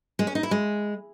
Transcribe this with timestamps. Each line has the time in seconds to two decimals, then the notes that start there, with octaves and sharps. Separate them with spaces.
0.19 G#3
0.27 C#4
0.35 D#4
0.43 E4
0.51 G#3